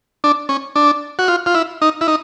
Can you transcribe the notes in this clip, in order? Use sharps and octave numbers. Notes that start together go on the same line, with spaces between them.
D4
C#4
D4
F#4
F4
F4
E4
D#4
E4
D#4